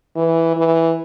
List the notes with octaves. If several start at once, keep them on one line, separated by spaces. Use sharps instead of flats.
E3
E3